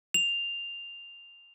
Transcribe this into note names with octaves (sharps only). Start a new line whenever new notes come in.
F7